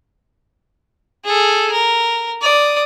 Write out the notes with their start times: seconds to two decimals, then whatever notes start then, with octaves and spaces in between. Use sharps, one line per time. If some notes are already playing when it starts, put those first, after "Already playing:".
1.25 G#4 A4
1.72 A#4
2.42 D5 D#6